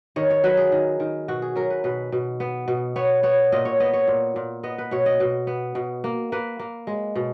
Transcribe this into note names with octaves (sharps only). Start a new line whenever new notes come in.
D#3 C#5
C#5
F#3 B4
G#4
D#3
D#3
B2 F#4
G#4
F#3 A#4
B4
B2 B4
B2
B3
B2
B3 C#5
B3 C#5
A#2 D#5
C#5
B3 D#5
C#5
A#2
A#2
B3 D#5
B4
B2 C#5
D#5
B2
B3
B2
A#3
A#3 B4
A#3
G#3
B2